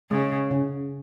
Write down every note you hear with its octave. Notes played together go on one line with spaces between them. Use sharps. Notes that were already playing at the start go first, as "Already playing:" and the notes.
C#3 G#3
C#3